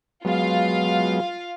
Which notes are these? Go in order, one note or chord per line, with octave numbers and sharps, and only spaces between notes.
F#3 G#3 B3 F4 F5